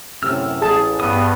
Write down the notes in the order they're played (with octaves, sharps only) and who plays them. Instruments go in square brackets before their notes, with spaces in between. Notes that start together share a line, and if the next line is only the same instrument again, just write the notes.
[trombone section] F#2 A2 C3 [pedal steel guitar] E6 F6
[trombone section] A1 [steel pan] G#4 A5
[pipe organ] G2 B3 [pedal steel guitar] D#6